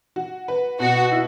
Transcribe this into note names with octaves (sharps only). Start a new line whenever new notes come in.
F#4
B4
B2 F#4
E4